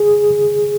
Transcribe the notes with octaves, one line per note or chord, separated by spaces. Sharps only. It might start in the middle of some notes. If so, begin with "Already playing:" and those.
Already playing: G#4